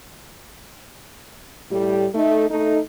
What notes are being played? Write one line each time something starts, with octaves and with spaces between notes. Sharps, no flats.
A2 G3 G4
A3 D#4
A3 D#4